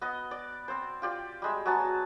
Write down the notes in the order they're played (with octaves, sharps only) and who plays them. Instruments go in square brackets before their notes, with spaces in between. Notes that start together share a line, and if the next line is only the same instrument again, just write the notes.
[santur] B3 D#5
D5
C4 C5
F4 G4 D5
G3 G#3 E5
F#3 B3 G#4 A5